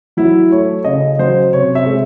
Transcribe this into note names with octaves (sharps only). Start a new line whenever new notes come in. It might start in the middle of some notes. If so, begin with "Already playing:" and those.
F#3 E4
A3 C#5
C#3 D#5
F#3 C5
C3 C#5
E5
G#3